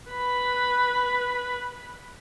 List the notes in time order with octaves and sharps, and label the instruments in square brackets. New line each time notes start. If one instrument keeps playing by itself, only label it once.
[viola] B4 B5